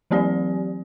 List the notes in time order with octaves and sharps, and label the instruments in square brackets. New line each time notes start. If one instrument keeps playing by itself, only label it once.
[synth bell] E3 F#3 C4 G4 D5